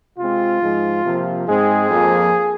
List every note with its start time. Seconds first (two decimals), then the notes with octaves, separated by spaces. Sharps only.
0.18 C3 G#3 C4 F4
0.62 G#2 F3 G#3
1.04 C3 F3 A#3
1.47 G#2 G#3 C4 G#4
1.90 F2 F3 A#3